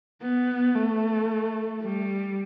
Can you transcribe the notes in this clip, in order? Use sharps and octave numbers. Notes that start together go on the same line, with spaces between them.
B3
A3
G3